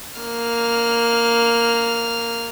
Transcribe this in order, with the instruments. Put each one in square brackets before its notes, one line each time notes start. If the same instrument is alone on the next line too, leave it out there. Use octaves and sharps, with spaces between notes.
[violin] A#3 F6